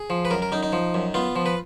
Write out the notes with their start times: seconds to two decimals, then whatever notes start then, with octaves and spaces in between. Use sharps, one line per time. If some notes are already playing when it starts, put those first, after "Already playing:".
Already playing: G#4
0.10 F3
0.25 B4
0.31 F#2 A#4
0.42 A#4
0.52 F#2 D#4
0.63 D#4
0.73 F3
0.94 F#2
1.14 B3 F4
1.36 F3
1.46 B4